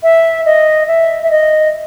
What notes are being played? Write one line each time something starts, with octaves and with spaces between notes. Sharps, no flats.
E5
D#5
E5
E5
D#5